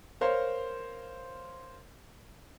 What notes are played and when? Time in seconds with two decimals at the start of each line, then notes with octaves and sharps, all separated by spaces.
0.21 A#4 C5 C#5 F5